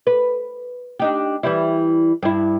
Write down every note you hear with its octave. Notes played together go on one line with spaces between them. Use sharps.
B4
D4 D#4 G4
E3 G3 E4
G2 E4